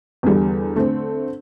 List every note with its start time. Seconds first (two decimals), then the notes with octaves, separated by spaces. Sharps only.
0.23 E2 D3 G3
0.76 D3 A3 C4